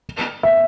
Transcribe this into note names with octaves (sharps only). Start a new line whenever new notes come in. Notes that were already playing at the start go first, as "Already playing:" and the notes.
E5